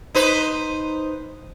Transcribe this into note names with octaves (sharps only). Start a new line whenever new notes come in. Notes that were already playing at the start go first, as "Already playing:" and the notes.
D#4 B4 C5